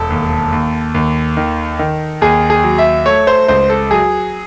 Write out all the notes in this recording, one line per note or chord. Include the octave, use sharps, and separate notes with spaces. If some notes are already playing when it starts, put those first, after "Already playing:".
Already playing: E1 A4
D#2
D#2
D#2
D#3
D#3
D#2 G#4
G#4
F#3
E5
A3 C#5
C5
C#2 C5
A4
F#3 G#4